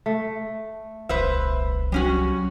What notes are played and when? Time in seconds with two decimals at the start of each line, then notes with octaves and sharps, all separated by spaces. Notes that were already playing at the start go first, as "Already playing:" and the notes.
0.06 A3
1.09 D#1 C2 B4 C5 E5
1.92 F#3 G3 C#4 F#4